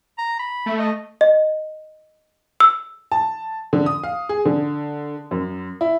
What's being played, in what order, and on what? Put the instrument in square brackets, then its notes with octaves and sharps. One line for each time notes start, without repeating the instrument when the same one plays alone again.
[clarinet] A#5
B5
[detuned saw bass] A3
[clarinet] D#5
[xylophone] D#5
E6
[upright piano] A5
D3
D#6
F5
G#4
D3
F#2
E4